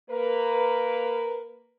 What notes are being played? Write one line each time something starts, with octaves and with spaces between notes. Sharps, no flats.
A#3 A#4 B4